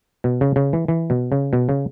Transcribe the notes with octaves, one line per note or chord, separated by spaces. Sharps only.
B2
C#3
C#3
E3
E3
B2
C#3
B2
C#3